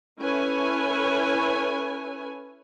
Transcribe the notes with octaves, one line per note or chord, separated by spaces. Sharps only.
C#4 E4 A4 B4 C#5 G#5